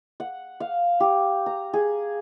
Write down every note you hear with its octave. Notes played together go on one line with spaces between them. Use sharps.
F#5
F5
G4
A#5
G#4